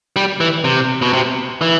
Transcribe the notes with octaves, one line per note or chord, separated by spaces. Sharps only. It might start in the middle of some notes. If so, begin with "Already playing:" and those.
G3
E3
C3
B2
C3
E3